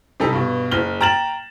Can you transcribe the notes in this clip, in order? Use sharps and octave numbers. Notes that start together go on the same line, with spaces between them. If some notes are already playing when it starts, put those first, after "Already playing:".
C3 G3 D#4 A4
G2 B2
F#1 F6 G7
G5 A#5 F6 A6 E7 F#7